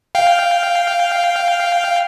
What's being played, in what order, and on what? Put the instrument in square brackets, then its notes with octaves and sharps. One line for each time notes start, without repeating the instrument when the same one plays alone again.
[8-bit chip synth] F5 G5